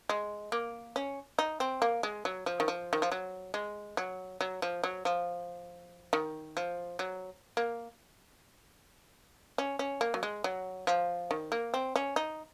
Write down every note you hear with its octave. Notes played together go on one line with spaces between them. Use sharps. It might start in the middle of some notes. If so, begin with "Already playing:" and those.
G#3
A#3
C#4
D#4
C4
A#3
G#3
F#3
F3
D#3
F3
D#3
F3
F#3
G#3
F#3
F#3
F3
F#3
F3
D#3
F3
F#3
A#3
C#4
C#4
A#3
F#3
G#3
F#3
F3
D#3
A#3
C4
C#4
D#4